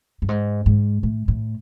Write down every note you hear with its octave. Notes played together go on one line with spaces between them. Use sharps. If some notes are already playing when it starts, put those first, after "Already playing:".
G2
G#2
G#2
A2
A2